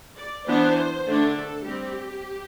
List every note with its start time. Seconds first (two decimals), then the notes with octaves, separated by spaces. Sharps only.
0.17 D5
0.46 E3 B3 D4 C5
1.06 D3 A3 D4
1.35 A4
1.64 G3 C4 G4